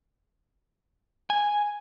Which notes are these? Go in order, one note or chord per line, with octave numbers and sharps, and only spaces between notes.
G#5